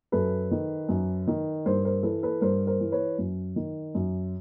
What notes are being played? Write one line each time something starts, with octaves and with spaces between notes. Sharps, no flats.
F#2 A4 B4
D#3
F#2
D#3
G2 A#4 C5
A#4 C5
E3 A4 B4
A4 B4
G2 A#4 C5
A#4 C5
E3
B4 C#5
F#2
D#3
F#2